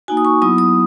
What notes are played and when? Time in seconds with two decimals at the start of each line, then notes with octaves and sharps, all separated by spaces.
0.08 A#3 D#4 F#4 G#5
0.17 D#6
0.25 C#6
0.42 F#3 B3 E4 D#6
0.58 D#6